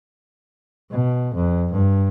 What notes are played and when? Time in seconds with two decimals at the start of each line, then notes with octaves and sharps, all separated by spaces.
0.91 B2
1.35 F2
1.72 G2